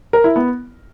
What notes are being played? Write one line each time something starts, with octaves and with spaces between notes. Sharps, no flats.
A#4
E4
B3